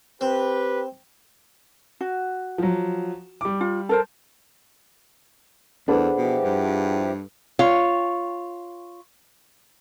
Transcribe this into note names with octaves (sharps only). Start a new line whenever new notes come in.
C4 G4 B4
F#4
F3 F#3
G3 D6
F4
A4 A#4 C5
E2 D4 G#4 A4 B4 C5 F#5
B2 E3 F3 G4
G2
F4 C#5